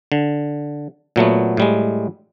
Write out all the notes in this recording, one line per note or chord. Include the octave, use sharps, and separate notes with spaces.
D3
A#2 F#3 A3 B3
A2 G3 G#3